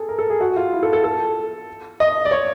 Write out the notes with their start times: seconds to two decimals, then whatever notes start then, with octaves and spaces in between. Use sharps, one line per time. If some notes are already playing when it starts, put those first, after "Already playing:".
Already playing: G#4 A4
0.09 A#4
0.19 A4
0.30 G#4
0.41 F#4
0.56 F4
0.73 E4
0.83 A4
0.93 A4
1.04 A4
2.00 D#5
2.25 D5
2.31 C#5